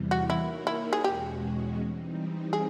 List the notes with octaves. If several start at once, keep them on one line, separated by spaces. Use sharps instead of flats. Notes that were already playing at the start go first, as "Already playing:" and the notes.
Already playing: E2 C3 E3 G3
F#4
A#3 D#4 E4 F#4 A#4 C#5
E4
G#4
E2 B2 G#3 C#4 F#4 G4
E3 G3 C4 D#4
G#4